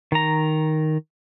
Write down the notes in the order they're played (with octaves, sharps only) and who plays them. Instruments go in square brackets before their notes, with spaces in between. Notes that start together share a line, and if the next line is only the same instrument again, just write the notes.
[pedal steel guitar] D#3 A#5